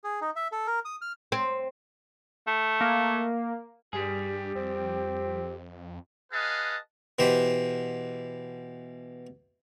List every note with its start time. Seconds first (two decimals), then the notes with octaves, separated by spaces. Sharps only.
0.04 G#4
0.21 D#4
0.36 E5
0.52 A4
0.67 A#4
0.85 D#6
1.01 F6
1.32 C4
2.47 A3
2.81 A#3
3.93 G2 G3 G4 G#4
4.55 F2 C4
6.32 G#4 B4 D#5 F5 F#5 A5
7.19 B2 E3 G4 C5